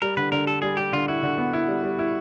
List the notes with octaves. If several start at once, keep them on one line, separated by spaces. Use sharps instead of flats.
G3 A#4
D3 B4
D3 A#4
G3 A4
G3 G#4
G3 G4
D3 F4
E4 F#4
D3
B3
E4
G3
G3
E4